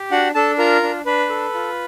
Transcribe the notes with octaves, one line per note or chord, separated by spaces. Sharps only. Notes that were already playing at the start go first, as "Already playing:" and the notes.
Already playing: G4
D4 F#4 F#5
D4 A4 A5
F4 A#4 A#5
D4
D4 B4 B5
A4
F4